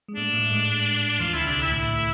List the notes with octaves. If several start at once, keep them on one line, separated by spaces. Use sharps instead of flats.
G#3
A2 A3 D4
A2 A3
G#2 G#3
E2 E3 F4
D2 D3 E4
C2 C3 D4
D2 D3
E4
A2 A3
A2 A3